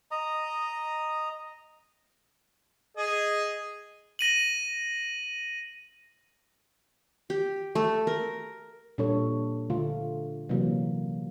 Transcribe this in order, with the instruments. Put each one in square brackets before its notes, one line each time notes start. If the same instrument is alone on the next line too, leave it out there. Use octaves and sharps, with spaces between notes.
[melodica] D#5 A#5 D#6
[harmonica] G#4 D#5
[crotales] A#6 D#7 F#7
[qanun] G4
A3
A#4
[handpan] A#2 G3 D4 A4 C#5
D3 A3 F4
C3 E3 F#3 A#3